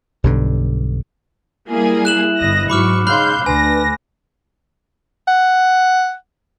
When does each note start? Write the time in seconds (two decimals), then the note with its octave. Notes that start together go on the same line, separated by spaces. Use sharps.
0.24 B1 G2 D3
1.70 G3 A#3 E4 G#4
2.05 F#6 E7 F#7
2.38 G1 D#5 A#6
2.70 G#2 F#3 B5 C#6 D6 F6
3.07 G#2 C#3 F5 B5 C6 F#6 G6
3.46 D2 D4 B4 G#5 A#6
5.27 F#5